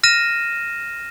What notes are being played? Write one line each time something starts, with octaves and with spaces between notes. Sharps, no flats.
F6 A#6 D#7 E7